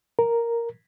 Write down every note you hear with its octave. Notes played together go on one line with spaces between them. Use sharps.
A#4